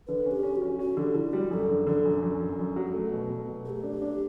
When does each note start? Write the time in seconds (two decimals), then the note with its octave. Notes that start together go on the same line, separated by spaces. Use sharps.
0.07 D3 B4
0.26 C#4
0.31 G4
0.43 C#4
0.56 F#4
0.62 C#4
0.79 C#4 F#4
0.97 D3 G4
1.14 D3 E4
1.33 G3 F#4
1.51 F#2 A4
1.69 D3
1.86 D3 A4
2.05 F#2
2.22 F#2
2.40 F#2
2.59 F#2
2.76 F#3
2.94 A3
3.11 B2
3.29 B2
3.47 B2
3.65 A3 A4
3.70 G4
3.83 D4
4.01 D4